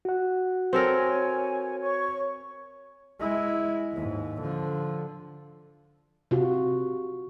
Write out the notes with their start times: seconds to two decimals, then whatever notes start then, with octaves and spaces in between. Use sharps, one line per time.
0.05 F#4 F#5
0.73 C4 A4 A#4 C#5 G#5
1.81 C#5 C#6
3.20 G#3 E4
3.93 D#2 G#2
4.42 D3 F3
6.31 C3 F4 F#4